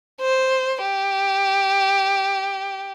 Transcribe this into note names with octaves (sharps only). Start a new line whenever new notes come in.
C5
G4